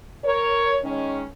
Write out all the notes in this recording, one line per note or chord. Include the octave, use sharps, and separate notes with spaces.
A#4 C#5
D#3 G#3 C#4